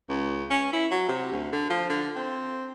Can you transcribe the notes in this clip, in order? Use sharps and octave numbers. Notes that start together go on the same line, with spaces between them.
C#2
C#4
E4
F#3
C3
D2
D3
F3
D3
C4